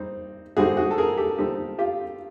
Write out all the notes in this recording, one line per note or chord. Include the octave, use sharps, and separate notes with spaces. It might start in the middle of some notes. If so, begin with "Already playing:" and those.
Already playing: G3 C4 D#4
D3 G3 C4 D#4 F#4 G#4
F#4 G#4
A4
G#4 A#4
G4 A4
D3 G3 C4 D#4 G4 A4
F4 G4